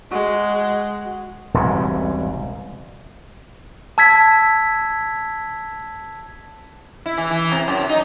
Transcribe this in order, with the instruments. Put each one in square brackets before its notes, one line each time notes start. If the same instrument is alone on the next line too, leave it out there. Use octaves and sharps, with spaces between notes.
[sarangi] G#3 [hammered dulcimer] F#4
[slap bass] E1 C2 G#2 C#3
[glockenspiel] A5 E6 G#6 B6
[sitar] E4
E3
E3
C3
F#2
D#4